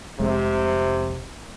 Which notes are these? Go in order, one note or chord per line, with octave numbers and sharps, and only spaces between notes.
F1 C3 G#3